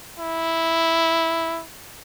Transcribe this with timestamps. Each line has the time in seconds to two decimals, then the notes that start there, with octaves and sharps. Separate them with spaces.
0.19 E4